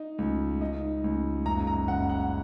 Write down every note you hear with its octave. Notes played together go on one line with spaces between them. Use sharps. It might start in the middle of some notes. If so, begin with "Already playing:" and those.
Already playing: D#4
C#2
D#4
C#2
F#1 A#5
A#5
F#1 F#5
F#5